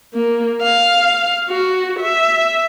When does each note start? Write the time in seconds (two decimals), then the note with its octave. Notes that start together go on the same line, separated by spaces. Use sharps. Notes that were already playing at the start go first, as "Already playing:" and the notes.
0.14 A#3
0.62 F5
1.49 F#4
2.00 E5